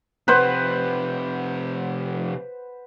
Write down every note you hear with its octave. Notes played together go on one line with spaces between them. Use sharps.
F2 C3 B4 C5 F#5